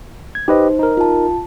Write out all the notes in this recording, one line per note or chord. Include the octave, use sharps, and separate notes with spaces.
G#6
D#4 G4 B4 C5 D#5
D#4 A#4
F4 A5